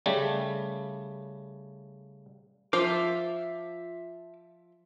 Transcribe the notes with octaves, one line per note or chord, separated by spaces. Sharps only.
C#3 G3 A3
F3 F4 C5 E5 D6